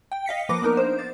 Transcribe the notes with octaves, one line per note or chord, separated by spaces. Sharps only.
G5
D#5 F5 B6 C#7
F3 A#3 B4 D6 A#6
B3 D4 D#4 A#4
C5
A6